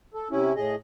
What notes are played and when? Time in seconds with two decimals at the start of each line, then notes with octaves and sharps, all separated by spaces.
0.14 A4
0.31 C3 C#4 E4
0.56 A2 G#4 D#5